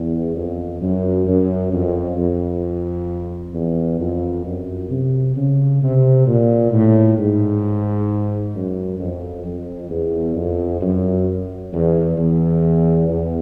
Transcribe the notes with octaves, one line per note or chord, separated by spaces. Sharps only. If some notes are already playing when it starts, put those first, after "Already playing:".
Already playing: E2
F2
F#2
F#2
F2
F2
E2
F2
F#2
C3
C#3
C3
A#2
A2
G#2
F#2
F2
F2
E2
F2
F#2
E2
E2
E2